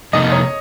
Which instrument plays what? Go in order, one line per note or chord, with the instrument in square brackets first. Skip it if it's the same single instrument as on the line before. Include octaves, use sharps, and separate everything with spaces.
[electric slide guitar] F2 C3 F3 A#3 D#4 [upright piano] D#5
[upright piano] C#5